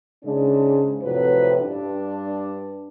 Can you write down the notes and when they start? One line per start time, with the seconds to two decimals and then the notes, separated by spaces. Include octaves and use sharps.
0.24 G#2 C#3 G#3 D4
1.02 F2 A2 C3 F#3 B4
1.60 G2 D4